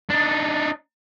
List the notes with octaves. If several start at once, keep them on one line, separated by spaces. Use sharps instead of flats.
D4 D#4